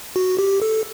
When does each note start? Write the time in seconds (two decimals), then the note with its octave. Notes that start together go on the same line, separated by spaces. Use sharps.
0.16 F#4
0.39 G4
0.62 A4